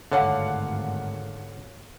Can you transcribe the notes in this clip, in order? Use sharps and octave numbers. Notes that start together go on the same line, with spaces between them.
G#1 D2 G2 D3 C#5 F5 F#5